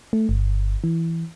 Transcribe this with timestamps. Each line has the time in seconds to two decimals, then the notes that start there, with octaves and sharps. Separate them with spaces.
0.13 A3
0.29 G1
0.84 E3